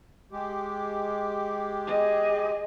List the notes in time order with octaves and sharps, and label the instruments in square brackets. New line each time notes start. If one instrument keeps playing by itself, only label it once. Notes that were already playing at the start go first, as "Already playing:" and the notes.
[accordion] G#3 G4
[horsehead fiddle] G#4 D#5